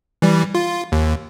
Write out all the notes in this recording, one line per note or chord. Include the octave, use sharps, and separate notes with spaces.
E3 G3
F4
D#2